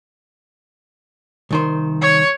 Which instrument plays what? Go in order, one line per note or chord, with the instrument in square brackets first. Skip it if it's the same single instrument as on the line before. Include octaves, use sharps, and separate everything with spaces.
[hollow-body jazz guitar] C2 D#3 C5
[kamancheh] C#5